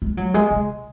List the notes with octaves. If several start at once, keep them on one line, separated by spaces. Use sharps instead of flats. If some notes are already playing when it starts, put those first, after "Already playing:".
G#3
F#3
G#3
C#3